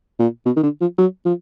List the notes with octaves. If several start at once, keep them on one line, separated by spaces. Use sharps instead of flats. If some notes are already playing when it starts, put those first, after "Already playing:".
A#2
B2
D#3
D3
F3
F#3
F3